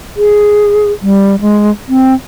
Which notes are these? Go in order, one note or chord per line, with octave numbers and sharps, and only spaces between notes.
G#4
G3
G#3
C4